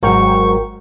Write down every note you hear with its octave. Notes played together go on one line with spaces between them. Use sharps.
G#1 G#2 F#3 A#4 G5 C#6